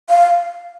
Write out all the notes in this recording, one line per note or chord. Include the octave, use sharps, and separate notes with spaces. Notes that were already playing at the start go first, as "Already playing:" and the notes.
F5